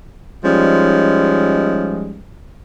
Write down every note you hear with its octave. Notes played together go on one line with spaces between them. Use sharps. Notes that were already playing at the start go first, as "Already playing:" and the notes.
F3 G3 G#3 C#4 D#4